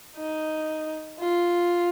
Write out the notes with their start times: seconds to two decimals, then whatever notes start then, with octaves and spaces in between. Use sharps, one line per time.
0.16 D#4
1.20 F4